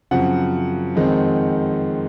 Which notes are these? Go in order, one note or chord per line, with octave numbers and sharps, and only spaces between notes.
F#2 C#3 F3 C4 F#5
F2 D#3 G#3 C4